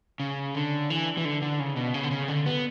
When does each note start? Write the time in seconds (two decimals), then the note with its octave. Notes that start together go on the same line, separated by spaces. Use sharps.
0.20 C#3
0.55 D3
0.90 E3
1.17 E3
1.25 D3
1.42 D3
1.60 C#3
1.76 B2
1.94 C#3
2.03 D3
2.11 C#3
2.28 D3
2.46 B3